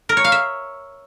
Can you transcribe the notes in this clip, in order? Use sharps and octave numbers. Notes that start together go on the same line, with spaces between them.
A#4
C#5
F5
E5